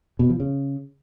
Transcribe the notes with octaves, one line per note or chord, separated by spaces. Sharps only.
B2
F3
C#3